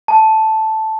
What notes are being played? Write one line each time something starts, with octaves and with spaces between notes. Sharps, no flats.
A5